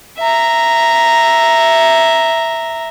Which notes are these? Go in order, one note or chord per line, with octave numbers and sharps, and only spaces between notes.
E5 A#5